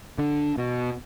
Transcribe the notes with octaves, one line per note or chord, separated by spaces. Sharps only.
D3
B2